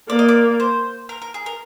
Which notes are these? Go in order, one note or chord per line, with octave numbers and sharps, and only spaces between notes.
A#3 D5
D#5
D5
C5
A#4
A#4
G#4
A#4